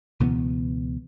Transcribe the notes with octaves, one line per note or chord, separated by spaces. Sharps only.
C#2 B2 E3 B3